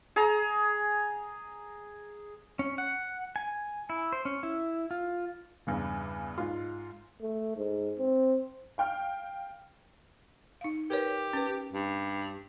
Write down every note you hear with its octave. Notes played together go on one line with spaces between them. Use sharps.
G#4 A#5
C#4
F#5
G#5
E4
C5
C#4
E4
F4
E2 G2 C#3
G#2 F4
A3
G#2
C4
F5 G5 F6
D#4 F5
G4 A#4 B4 C#5
C#4 B4
G2